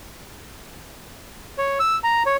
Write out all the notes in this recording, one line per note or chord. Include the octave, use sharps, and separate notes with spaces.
C#5
E6
A#5
C#5